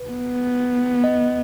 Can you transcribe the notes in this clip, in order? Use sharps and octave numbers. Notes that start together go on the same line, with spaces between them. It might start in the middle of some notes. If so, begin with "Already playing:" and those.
Already playing: B4
B3
D#5